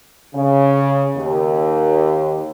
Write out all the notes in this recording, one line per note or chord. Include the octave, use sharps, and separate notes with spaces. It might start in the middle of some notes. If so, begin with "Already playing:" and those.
C#3
D#2